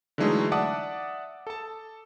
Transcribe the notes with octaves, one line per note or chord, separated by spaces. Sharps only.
D3 E3 F#3 G#3 A3 D#4
D5 E5 F#5 A5 D6 D#6
A4 A5